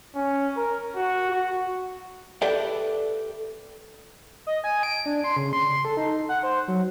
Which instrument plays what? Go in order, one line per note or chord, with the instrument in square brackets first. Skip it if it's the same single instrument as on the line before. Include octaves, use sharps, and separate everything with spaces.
[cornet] C#4
A#4
F#4
F#4
[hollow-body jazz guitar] G4 A4 B4 D5 E5 G5
[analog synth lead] D#5
G#5
D7
D4
C6
C#3
C6
A4
D#4
F#5
C5
F#3